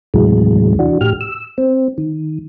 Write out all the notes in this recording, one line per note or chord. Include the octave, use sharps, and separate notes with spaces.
D#2 A2 C3 E3 F#3 G#3
E3 D4 F#4
A2 G4 F6
E6
C4
D#3